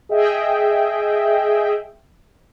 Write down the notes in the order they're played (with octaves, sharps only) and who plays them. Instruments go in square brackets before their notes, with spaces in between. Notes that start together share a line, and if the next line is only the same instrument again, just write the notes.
[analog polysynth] G#4 D#5 E5 G5